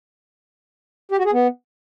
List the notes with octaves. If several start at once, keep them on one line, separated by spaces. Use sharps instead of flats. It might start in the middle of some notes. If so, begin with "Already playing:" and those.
G4
F#4
G#4
B3